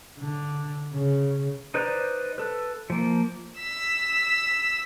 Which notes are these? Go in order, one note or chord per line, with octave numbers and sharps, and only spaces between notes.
D3
C#3
D#4 B4 C5 D5 A#5
A4 B4
F3 A#3
E6 B6